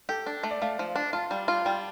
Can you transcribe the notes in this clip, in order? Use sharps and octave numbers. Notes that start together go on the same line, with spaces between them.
G4 A4
D4
A3
D5
A3 F5
F3
D4
F4 A5
G3
F4
G3 G5